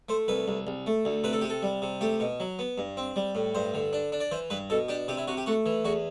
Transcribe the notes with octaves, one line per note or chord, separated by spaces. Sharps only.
A3 C5
C2 B4
C2
C2
A3
D2
C3 B4
A4
C3 G4
A4
G3
C3
A3 G4
B2
F#3
B3
G2
C4
G3
A2
G2 C5
D3
D4
D4
D5
E3 C5
G2 B4
B2 A4
D4 G4
C3 G4
E4
C3 F#4
G4
A3 F#4
E3
E2 F#4